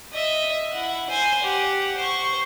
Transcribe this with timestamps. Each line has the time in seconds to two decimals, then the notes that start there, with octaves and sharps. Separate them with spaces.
0.12 D#5 E5
0.72 E4 F#5
1.10 C5 G#5
1.43 G4 F#5
1.97 C5 C#6